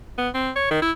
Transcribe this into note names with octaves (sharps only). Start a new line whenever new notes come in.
B3
C4
C#5
D#3
E4